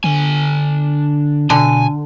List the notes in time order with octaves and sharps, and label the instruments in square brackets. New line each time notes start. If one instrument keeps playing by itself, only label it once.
[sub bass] D3 [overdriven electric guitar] D4 G#5
[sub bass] B2 [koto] D3 [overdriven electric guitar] G#5